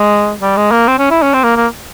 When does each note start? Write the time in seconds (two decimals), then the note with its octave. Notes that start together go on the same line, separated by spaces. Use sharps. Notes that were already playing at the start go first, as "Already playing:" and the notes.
Already playing: G#3
0.42 G3
0.57 G#3
0.72 A#3
0.88 C4
0.99 C#4
1.11 E4
1.22 C#4
1.34 C4
1.44 A#3
1.56 A#3